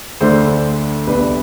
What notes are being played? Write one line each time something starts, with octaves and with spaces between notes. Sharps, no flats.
D2 D3 A3 D4 C5
C2 B2 A3 D4 B4